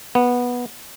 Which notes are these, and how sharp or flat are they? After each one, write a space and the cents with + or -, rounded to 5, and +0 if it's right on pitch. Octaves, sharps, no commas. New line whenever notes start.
B3 -10